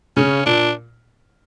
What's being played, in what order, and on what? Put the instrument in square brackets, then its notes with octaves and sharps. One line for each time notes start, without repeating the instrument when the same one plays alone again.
[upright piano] C#3 [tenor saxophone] C#4
[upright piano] A#2 [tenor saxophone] D4